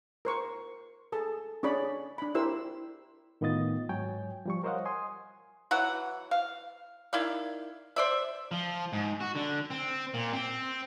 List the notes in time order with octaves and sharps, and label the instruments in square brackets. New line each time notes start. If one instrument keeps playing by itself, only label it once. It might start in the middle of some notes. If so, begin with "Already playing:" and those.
[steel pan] A#4 C5 C#6
G#4 A4 A5
C#4 D4 G#4 C#5 D5 B5
D4 B5
E4 G4 A#4 C5 E6
[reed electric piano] A2 D#3 B3 F4 D#5 A6
G#2 F#3 C#5 G5 G#5
F3 G3 C#6
A#4 C5 C#5 D#5 F5 F#5
G#5 C6 D#6
[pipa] E3 F#3 F#5
F5
D#3 E4 D5 F5
C5 D5 E5
[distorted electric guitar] F3
G#2
F#4
D3
C4
A#2
C4